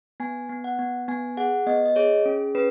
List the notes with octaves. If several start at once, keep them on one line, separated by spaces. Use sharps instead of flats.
B3 G#5
B3
F#5
B3
B3 G#5
G#4 F#5
B3 D#5
D#5
G#4 C#5
C#4
C#4 B4